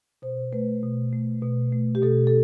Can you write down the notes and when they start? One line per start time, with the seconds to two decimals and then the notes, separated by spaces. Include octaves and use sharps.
0.22 B2 C5
0.52 A3 B4
0.83 B2
1.13 A3
1.42 B2
1.73 A3
1.95 G4
2.03 B2 A4
2.27 A4